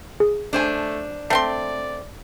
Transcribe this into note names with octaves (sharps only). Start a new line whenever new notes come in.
G#4
A3 D4 C5 G#5
A3 C4 D5 C6 C7